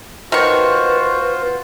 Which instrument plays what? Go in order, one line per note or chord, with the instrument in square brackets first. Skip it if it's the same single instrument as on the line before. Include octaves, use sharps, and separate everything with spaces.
[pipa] D#3 C#6 [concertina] F4 C5 [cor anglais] F#4 [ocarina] B4